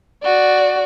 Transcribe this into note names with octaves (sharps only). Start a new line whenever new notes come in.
F#4 D5